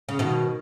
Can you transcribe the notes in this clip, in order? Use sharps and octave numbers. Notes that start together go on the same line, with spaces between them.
C#3
B2 D#3